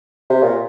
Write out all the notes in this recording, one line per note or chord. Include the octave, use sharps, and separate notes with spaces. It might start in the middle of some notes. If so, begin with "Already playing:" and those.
C3
A#2